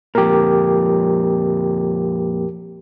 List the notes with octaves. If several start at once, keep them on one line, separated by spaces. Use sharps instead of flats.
F2 A#2 G4 A#4